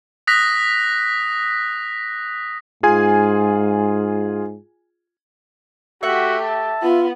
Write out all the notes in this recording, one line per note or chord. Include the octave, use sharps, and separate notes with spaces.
D#6 F#6 A#6 B6
G#2 F4 G#4 G#5
A3 F#4 G4 E5 F#5
A5
B3 F4